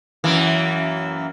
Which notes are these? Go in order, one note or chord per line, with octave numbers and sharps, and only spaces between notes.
F#2 E3 A#3